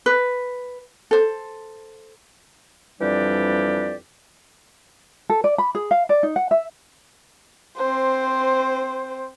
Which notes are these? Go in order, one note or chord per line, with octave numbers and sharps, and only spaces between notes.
B4
A4 C5
F2 E3 G3 D4 G4 D5
A4
D5
B5
G#4
F5
D5
D#4
F#5
E5
C4 C5